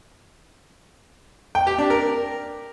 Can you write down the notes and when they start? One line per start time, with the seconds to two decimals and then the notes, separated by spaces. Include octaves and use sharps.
1.55 G5
1.67 G4
1.78 D4
1.90 A#4